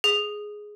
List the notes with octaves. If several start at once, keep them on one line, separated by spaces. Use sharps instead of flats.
G#4